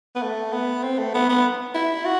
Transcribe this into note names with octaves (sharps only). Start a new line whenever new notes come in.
B3
A3
B3
C4
A3
B3
B3
E4
F#4